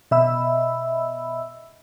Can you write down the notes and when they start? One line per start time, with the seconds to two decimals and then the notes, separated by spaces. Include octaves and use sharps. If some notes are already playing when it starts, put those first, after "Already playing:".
0.11 B2 D#5 E5 B5 E6